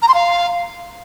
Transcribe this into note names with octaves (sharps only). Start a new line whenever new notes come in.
A#5
C6
F5